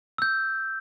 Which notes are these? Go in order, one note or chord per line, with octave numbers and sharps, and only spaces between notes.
E6 G6